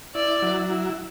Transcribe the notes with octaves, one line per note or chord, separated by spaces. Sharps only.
E4 D5
F#3
E4